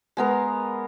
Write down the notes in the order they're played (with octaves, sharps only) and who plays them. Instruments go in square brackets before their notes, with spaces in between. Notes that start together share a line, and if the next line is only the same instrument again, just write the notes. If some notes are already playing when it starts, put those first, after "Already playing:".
[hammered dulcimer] G#3 B3 A#4